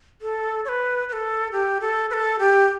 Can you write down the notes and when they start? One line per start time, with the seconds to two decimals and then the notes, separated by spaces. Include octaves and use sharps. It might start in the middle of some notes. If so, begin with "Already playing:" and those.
0.21 A4
0.65 C#5
0.68 B4
1.09 B4
1.13 A4
1.52 G4
1.81 A4
2.10 B4
2.13 A4
2.39 G4